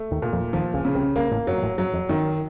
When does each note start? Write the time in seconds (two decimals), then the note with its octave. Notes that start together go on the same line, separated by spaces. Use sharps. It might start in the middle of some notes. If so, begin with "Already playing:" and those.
Already playing: A3
0.11 D#2 D#3
0.22 A#2
0.33 F2 F3
0.53 D#2 D#3 F3
0.74 C#2 C#3
0.85 C#3
0.95 C2 C3
1.15 C2 C3 A#3
1.31 A1 A2
1.47 F#2 F#3
1.57 A#2
1.62 A1 A2
1.78 F#2 F#3
1.93 F2
2.09 F#2 D#3